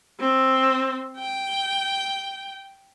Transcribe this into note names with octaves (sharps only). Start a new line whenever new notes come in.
C4
G5